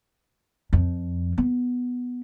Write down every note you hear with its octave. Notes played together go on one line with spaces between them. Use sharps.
F2
B3